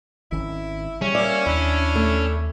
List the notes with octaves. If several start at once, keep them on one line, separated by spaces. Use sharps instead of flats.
G#1 D#3 C#4 E4
C#3 G3 C#4
A#3 D5 E5
D#2 D4 E4
A3